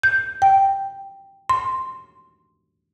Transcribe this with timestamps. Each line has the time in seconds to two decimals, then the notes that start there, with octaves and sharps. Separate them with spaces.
0.03 G6
0.42 G5
1.49 C6